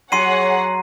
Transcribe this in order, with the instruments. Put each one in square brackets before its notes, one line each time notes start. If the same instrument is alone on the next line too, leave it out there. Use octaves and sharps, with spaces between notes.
[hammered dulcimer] F#3 [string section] G#4 C#5 F#5 [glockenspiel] C6 C7 D#7